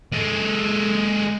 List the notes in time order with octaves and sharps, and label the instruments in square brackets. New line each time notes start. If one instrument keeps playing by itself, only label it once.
[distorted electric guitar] G#3 A4